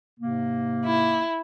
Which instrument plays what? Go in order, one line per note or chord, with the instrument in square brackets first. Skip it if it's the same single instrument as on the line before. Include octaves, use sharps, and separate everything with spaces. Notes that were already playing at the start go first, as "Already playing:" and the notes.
[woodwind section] G#2 C3 A#3
[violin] E4